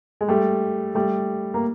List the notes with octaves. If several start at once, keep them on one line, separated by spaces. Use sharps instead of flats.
G#3
G3 A3
G3 A3
A#3